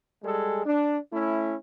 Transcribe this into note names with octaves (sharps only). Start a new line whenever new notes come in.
G3 G#3 G#4 A4
D4
A3 C#4 E4